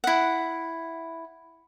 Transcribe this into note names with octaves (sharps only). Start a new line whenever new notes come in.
E4 F#5